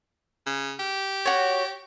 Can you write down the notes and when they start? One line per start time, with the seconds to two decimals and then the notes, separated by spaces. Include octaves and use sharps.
0.46 C#3
0.79 G4
1.25 F#4 C#5